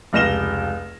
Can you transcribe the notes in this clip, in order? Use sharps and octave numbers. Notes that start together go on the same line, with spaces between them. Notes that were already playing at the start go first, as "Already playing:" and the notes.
F1 C#2 F6 A#6 E7 G7